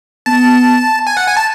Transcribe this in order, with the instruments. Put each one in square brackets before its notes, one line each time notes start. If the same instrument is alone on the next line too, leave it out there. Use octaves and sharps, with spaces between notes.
[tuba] B3 [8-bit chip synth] A5
[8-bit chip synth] G#5
F#5
G#5
A5